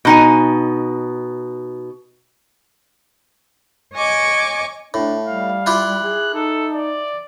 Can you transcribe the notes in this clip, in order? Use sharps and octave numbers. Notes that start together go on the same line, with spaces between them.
B2 D#4 G#5
C#5 D#5 G#5 C#6 D6
A2 D4
G3 F5
E4 F4 G4 F#6
G#4
D#4 A4
D5